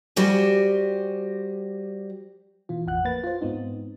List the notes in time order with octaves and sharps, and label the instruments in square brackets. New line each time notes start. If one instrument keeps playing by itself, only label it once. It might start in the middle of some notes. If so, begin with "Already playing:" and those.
[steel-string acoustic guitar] G3 F#4 G4 C5 G#5
[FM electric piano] B2 E3 F4
A1 F2 F#5 F#6
A#3 B4 A6
F4 C5
G#2 B3 C4 D#4